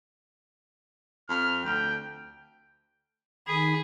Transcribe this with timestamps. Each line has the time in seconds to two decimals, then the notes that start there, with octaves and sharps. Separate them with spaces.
1.29 F2 F6
1.65 D2 G5
3.47 D#3 G#4 B5